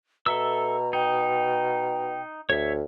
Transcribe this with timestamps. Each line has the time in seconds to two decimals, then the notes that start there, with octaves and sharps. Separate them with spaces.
0.26 B2 A4 E5 A#5 E6
0.93 D#4 G5
2.50 D2 C#5 E5